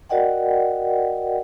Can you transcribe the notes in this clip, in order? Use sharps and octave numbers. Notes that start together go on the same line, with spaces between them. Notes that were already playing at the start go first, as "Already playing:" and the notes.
F#4 A#4 D5 D#5 F#5 G5